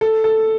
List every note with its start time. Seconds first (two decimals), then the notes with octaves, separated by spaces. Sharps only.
0.01 A4
0.24 A4